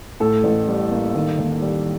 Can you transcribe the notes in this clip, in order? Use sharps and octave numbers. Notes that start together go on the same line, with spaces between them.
A2 A4
A1
G3
A#3
D#3
D#2
G3